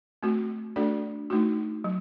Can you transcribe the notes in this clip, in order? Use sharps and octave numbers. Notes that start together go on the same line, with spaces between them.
A3 C4 F#4
A3 D4 F#4 A4 D5
A3 D#4 F#4
F#3